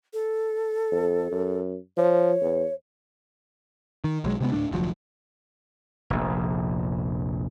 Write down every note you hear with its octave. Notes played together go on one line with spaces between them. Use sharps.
A4
F2
F#2
F3 C#5
E2
D#3
B1 F#3 G#3
C3 G#3 B3
D2 A2 A3 D4
F1 D2 F3 F#3
F1 A#1